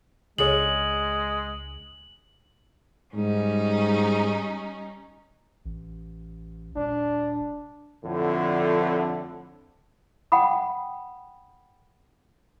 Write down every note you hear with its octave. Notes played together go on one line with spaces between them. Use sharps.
C#2 G#3 D4 G#4 C#5 F#7
G#2 G3 C#4 D#4
A1
D#1 D4
F2 A2 D3
F#5 G5 B5 D#6